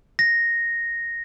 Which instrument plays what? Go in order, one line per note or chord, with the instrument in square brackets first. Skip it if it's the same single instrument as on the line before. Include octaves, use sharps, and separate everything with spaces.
[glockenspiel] A#6